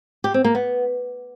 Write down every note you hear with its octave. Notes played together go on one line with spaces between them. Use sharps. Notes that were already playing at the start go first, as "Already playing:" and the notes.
G4
C4
A#3
B3